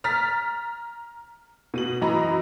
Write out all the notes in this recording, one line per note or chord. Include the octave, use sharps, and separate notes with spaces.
A#5 F6 A6 B6
B2 D#7 F#7
F#2 E3 D#5 A#5 B5